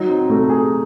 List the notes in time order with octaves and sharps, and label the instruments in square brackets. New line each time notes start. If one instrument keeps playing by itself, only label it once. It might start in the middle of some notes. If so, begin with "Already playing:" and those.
Already playing: [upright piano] F#3 [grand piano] D#4
[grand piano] C4
[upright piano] C3 [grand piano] A3
[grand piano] G#4